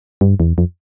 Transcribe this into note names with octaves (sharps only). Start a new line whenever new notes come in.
G2
E2
F2